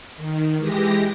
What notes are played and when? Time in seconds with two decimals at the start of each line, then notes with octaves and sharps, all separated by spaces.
0.17 D#3
0.58 E3 G#3 G4 A#6